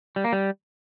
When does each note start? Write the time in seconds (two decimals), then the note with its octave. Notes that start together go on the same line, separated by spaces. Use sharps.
0.16 G3
0.24 A#3
0.33 G3